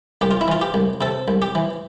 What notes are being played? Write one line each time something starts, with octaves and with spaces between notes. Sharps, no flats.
C2 G4
F4
E4
E3 F4
G4
C2
C3 A4
C2
G4
E3